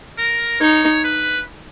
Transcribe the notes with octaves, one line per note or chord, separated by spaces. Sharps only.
A#4
D#4 C#5
B4